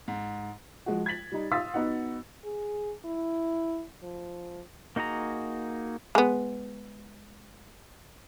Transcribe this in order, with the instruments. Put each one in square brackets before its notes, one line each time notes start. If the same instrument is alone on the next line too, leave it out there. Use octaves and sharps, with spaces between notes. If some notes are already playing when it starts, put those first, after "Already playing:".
[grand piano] G#2
[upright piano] F3 G#3 F#4
G#6 A6 B6 F#7
G3 D#4
F5 C6 D#6 E6 A6 B6
B3 D#4 F#4 F#5
[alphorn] G#4
E4
F3
[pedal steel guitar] A#3 D#4 F#4 G#4 A#5
[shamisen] G#3 B3